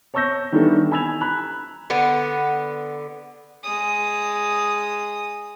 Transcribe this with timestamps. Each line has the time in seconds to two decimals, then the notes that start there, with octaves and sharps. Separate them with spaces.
0.14 C#5 A5 C#6 E6 G6 A#6
0.52 D#3 E3 G3 B3 D4 A4
0.92 G#5 B5 E6 G#6 F7
1.21 A#5 B5 F#6
1.90 D3 B3
3.64 G#3 D#6